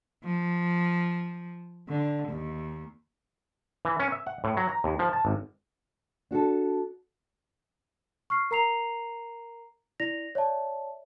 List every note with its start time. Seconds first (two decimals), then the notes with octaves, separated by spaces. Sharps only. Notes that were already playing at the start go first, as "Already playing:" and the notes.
0.24 F3
1.89 D3
2.29 D#2
3.85 E3
4.00 C#4
4.12 E5
4.27 F#5
4.44 A2
4.57 F#3
4.69 A#5
4.84 D#2
4.99 F3
5.13 A5
5.25 G#1
6.31 D4 F#4 G#4 A4
8.30 C#6 F6 C7
8.51 A#4 A#5 C7 F7
10.00 E4 D5 A#6 F7
10.35 C#5 D5 E5 A5